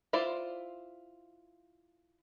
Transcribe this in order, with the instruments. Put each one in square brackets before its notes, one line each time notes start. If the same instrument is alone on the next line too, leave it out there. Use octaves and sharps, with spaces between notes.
[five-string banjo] E4 F4 C5 D5